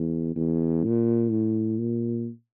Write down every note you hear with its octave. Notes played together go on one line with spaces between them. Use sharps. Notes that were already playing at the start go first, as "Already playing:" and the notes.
Already playing: E2
E2
A#2
A2
A#2